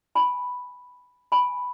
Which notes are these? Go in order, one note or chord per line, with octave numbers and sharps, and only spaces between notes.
G#5 B5
G#5 B5